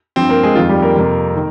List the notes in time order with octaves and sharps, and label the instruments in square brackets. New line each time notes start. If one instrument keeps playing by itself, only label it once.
[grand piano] G2 F3 C4 C5
A#3 A#4
G#3 G#4
F2 D#3 F4
G3 G4
A#3 A#4
F2 C3 F3
D#3